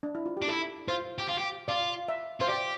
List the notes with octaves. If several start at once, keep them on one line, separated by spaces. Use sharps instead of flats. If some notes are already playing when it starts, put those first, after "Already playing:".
D4
E4
F4
D4 G4
E4 A4
F4 C5
G4
F4
G4
F4 D5
E5
F4 C5
G4 D5